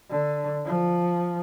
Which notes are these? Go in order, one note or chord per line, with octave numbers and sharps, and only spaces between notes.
D3
F3